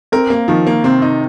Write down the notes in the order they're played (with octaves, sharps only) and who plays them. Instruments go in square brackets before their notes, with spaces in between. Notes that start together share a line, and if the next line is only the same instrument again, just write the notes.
[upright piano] C4 [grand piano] A#4
[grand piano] A#3
[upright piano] D#3 [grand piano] F3
[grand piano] A#3
[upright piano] C3 [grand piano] C4
[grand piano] D#4